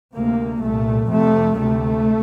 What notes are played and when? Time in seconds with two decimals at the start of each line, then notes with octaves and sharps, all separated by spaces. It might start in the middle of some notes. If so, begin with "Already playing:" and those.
0.14 D2 C3 A#3
0.62 C2 A#2 A3
1.09 F2 C3 A3
1.57 D2 C3 A3